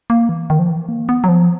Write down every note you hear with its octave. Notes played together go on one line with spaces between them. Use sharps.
A#3
E3
D#3
F3
E3
A#3
B3
F#3
F3